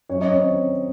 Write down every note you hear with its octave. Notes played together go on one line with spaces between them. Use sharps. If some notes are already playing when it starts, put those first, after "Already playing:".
F#2 C#5
D#5
C4 C#5